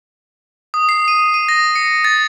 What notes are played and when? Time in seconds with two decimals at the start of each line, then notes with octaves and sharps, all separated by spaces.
0.74 D#6
0.89 C7
1.08 D#7
1.34 D#7
1.49 A#6
1.76 C#7
2.04 A6